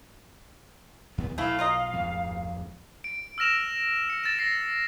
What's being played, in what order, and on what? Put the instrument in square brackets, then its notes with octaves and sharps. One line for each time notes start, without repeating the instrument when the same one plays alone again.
[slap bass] D#2 B3
[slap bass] B1 F#3 [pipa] A3 E4 [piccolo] F5
[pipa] F4 A#4 D#5
[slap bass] D1 F2 G#2
[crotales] D7
E6 F6 A#6 E7 F7
C#7
A6 E7
A#6 C7